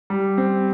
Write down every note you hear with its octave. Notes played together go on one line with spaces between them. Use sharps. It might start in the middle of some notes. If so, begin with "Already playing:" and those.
G3
C4